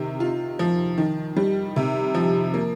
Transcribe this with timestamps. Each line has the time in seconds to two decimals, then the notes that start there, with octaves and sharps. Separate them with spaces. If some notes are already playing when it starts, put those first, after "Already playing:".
Already playing: C3 D#3
0.20 F4
0.59 F3
0.98 D#3
1.36 G3
1.76 C3
2.15 F3
2.54 A#3